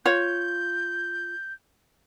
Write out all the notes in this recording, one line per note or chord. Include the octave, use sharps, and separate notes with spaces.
F4 C#5 G6